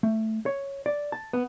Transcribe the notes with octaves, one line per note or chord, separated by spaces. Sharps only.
A3
C#5
D5
A5
B3